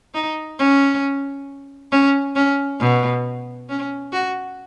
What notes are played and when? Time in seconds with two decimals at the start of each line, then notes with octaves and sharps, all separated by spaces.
0.14 D#4
0.59 C#4
1.92 C#4
2.36 C#4
2.80 B2
3.69 C#4
4.13 F#4